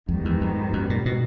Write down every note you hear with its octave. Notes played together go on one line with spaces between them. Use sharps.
F2 G#2 D#3 G3 B3
E2
F2
F#2
A#2
B2